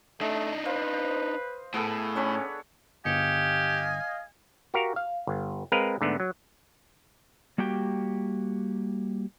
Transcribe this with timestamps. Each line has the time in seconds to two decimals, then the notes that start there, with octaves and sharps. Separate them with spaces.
0.21 A3 D4 D#4 D#5
0.65 B4 C5 F5 C6
1.74 A2 B3 G#4 A4
2.16 C#4 D4 C#5 B5
3.05 G1 G4 D#5 F5 G#5 C#7
4.74 F#4 G4 A#4 F5
4.96 F5
5.27 G1
5.72 G#3 C4 A#4 B4 F5
6.01 G#2 D3 A3 B3
6.20 F#3
7.58 G3 A#3 F#4 G4 G5